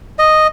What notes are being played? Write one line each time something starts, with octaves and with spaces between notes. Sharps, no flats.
D#5